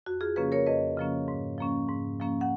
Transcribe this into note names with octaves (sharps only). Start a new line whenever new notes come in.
F2 F#4
F4 G#4
C#3 F3 A#3 C#4 G#4 B4
A#4 C#5
F2 B4 D#5
C#3 F3 A#3 C#4
G#2
F3 A#3 C#4
G#2
F3 A#3 C#4
F#5